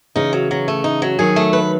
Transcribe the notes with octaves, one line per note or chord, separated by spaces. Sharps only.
C#3 E3 D#4
F#3
F#3
A3
D#4
F#3
D#3 F#3 G#4
A3
B4